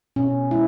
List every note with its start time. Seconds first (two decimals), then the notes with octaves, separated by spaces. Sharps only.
0.16 B2 C#4
0.51 G#3 E4